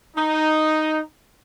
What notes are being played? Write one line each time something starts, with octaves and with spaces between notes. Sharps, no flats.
D#4